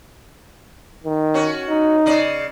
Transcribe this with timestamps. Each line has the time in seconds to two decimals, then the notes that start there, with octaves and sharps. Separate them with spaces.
1.04 D#3
1.34 C#4 F#4
1.69 D#4
2.06 C#3 D5 D#5